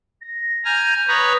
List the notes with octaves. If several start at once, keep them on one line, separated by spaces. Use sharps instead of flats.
A#6
G#5 A#5 F6 G6
B4 C#5 A#5 D#6